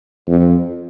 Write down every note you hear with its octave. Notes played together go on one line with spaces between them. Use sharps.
F2